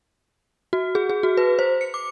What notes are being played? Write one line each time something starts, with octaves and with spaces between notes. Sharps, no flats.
F#4
G#4
G#4
F#4
B4
C5
C#7
D6